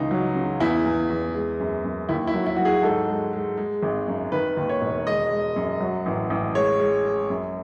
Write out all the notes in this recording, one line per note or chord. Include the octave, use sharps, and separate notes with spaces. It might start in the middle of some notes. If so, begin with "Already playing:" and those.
Already playing: C#2 E3 D#4
F#3
C#3
E2 E4
E2
E2
G#3
F#2
F#2
D#2 E4
E4
F#3
E4
F#3 F#4
G#4
G#2 A4
G#3
G#3
G#3
G#1
F#2
D#3 B4
D#2
C#5
E1
G#3 D#5
G#3
F#2
F#3
A1
A1
G#3 C#5
G#3
G#3
F#2